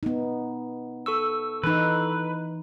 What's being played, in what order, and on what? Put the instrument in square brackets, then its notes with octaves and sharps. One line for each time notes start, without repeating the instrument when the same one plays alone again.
[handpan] B3 D#4
[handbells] A4 C#6 E6
[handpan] E3 D#4 [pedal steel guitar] B4